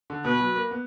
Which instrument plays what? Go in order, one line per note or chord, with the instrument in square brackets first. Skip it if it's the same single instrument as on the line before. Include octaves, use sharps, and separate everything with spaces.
[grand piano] D3
[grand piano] B2 [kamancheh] B4
[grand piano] F#3
A#3
B3